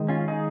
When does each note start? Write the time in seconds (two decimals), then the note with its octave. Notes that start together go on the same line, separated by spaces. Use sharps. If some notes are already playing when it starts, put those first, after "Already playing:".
Already playing: D#3 G#3
0.08 C#4 F4
0.28 D#4 G#4